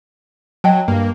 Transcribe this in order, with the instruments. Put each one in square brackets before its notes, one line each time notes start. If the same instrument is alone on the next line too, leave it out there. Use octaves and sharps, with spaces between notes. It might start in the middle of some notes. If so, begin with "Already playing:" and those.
[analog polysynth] F#3 [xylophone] D#5 G5 A5
[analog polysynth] G2 A#3